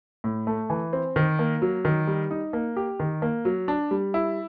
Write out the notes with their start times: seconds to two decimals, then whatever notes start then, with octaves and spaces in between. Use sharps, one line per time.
0.24 A2
0.47 A3
0.70 E3
0.93 C4
1.16 D#3
1.39 A#3
1.62 F#3
1.85 D#3
2.07 G3
2.31 D#4
2.53 A#3
2.77 G4
3.00 D#3
3.22 A#3
3.45 F#3
3.68 D4
3.91 G3
4.14 E4